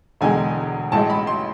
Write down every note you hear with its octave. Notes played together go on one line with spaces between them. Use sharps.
E1 E2 D3 G#3 G#5
A1 A2 G#3 A5
B5
C6